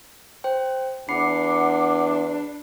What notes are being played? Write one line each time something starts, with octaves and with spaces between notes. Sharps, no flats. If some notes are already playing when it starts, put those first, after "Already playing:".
C5 G5
E2 D4 F#5 B5 D6 C7 C#7